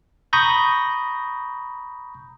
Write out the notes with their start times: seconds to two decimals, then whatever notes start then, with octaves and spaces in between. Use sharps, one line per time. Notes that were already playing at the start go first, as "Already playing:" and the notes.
0.33 A#5 B5 C#6 D#6 G6 A#6